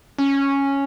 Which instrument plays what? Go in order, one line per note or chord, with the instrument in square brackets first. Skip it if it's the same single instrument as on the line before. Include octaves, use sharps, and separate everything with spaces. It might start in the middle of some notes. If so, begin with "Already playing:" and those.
[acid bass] C#4